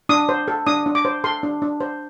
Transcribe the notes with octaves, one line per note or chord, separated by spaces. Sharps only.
D4 D#6
C5
A4
D4 D#6
D4
D6
C5
A4 C6
D4
D4
C5